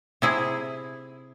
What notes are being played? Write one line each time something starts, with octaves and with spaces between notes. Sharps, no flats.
C3 E4 G#4